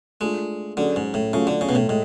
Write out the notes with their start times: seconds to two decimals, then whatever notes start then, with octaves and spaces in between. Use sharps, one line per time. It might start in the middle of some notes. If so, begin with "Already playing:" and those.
0.21 G#3 A3 D4 F4
0.77 D3 F#3 C#4 G#4
0.96 G#2
1.14 A2
1.33 C#3 F#3 A3 F4 A4 F5
1.47 D3
1.61 C#3
1.69 B2
1.75 A2
1.89 A2 G#3